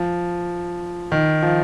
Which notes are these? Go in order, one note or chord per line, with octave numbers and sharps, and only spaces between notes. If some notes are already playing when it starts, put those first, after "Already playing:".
Already playing: F3
D#3
F3